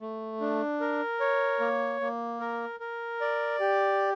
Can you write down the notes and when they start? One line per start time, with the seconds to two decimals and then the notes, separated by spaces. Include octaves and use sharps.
0.01 A3
0.41 D4
0.80 A#4
1.20 C#5
1.60 A#3
2.01 A#3
2.40 A#4
2.80 A#4
3.21 D5
3.60 G4